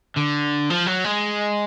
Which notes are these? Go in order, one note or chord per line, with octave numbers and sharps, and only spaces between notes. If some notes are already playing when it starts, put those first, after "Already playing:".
D3
F3
F#3
G#3